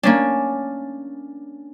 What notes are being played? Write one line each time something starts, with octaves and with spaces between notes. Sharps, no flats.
A#3 C#4 D4